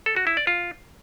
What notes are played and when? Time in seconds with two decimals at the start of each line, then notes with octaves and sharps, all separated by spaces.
0.06 A4
0.16 F#4
0.27 E4
0.37 D5
0.47 F4